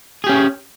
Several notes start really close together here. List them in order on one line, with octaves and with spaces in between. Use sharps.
G#4 G4 C#4